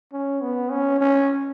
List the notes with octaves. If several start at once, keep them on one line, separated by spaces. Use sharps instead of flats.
C#4
B3
C#4
C#4